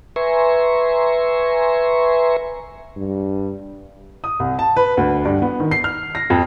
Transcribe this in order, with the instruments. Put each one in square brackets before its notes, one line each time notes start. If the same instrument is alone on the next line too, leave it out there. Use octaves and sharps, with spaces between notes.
[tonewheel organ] B4 E5 G#5 A#5 C6 C#6
[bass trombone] G2
[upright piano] D#6
C2
A5
B4
D2
G2
B3
D#3
C7
F6
A#6
F2